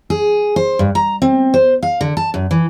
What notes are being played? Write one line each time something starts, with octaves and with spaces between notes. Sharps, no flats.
G#4
C5
G2
A#5
C4
C5
F5
D3
A5
F#2
E3